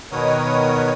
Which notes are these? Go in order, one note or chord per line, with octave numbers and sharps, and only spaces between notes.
B2 D#3 B3 A#4 C#5 D#6